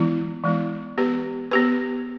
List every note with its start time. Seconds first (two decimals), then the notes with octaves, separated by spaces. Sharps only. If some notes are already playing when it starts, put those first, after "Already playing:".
Already playing: E3 G#3 B3 E4
0.44 E3 G#3 B3 E4
0.98 B3 G4 B4
1.51 B3 G4 B4